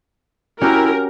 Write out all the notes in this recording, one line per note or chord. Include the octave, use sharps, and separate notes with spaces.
C#4 E4 F#4 G4 A#4